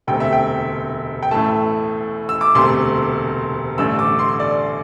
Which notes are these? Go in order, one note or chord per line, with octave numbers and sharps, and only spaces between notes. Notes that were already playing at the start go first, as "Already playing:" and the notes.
E1 D2 C3 A3 G5
E5
G5
G5
A1 A2 A3 A5
E6
D6
E1 D2 C3 A3 C6
A1 G2 D3 A3 E6
D6
C6
D5